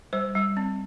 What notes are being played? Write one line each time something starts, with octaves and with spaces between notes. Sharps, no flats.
G3 C5
G3
C4